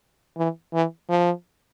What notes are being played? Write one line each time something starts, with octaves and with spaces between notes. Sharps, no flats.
E3
E3
F3